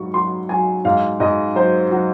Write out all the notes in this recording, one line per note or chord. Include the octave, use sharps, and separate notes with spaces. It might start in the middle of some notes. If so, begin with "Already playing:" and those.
Already playing: G#2 F#3 C#6
F#3 C6
F#3 G#5
G#2 F5
G#2 D#5
F#3 C5
F#3 F#4